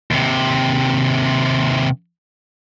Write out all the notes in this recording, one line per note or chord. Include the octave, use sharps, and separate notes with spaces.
D#2 C3